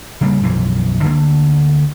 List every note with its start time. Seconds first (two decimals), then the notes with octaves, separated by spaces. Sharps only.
0.21 C#3 G3 A3 A#3
0.43 B1 F#2 E3 F3
1.04 D2 D3 A#3